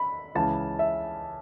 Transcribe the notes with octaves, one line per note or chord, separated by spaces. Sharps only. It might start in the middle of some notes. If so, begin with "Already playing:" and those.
Already playing: B5
C#2 C#3 E3 A5
E5